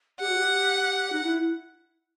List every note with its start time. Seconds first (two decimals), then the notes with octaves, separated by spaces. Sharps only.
0.20 G4 F#5
0.29 F#4
0.37 G4
1.12 D#4
1.23 E4